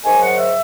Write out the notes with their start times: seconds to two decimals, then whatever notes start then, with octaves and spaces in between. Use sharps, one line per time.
0.04 G#2 D#3 F#3 G#5
0.21 F#5
0.37 E5